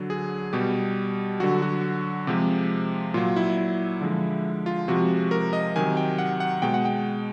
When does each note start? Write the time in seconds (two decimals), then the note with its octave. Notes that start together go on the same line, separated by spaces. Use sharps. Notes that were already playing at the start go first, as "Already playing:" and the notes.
Already playing: D3 F#3
0.10 G#4
0.53 B2 G3 G4
1.40 D3 F#3 F#4
1.62 F#4
2.27 C3 F3 G#3 G4
3.14 A#2 F#3 F4
3.36 E4
3.57 E4
4.01 D3 F3 G#3
4.66 F4
4.88 C3 F3 G#3 F#4
5.31 A#4
5.53 D#5
5.76 C3 D#3 F#3 G#5
5.97 G5
6.18 F#5
6.40 F#5
6.62 B2 G#3 G5
6.74 F#5
6.85 G5